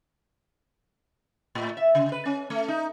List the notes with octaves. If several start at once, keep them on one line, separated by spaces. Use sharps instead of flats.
A2
E5
C#3
B4
C#4
A3
D#4